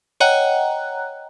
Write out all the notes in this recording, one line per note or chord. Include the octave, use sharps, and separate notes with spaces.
C#5 D#5 F#5 G5 A#5 F#6